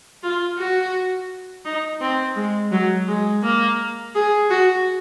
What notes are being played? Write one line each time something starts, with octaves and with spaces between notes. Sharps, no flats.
F4
F#4
D#4
C4
G#3
F#3
G#3
A#3
G#4
F#4